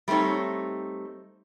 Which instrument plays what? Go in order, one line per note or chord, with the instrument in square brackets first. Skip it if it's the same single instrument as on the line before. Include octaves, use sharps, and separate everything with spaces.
[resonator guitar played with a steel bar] G3 A3 C4 D#4 C#5